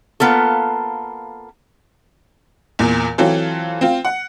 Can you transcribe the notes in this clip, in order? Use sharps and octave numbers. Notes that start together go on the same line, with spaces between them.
A#3 B3 F4 A4
E2 A#2
E3 F#3 C4 F4 A4
C4 F4
F#5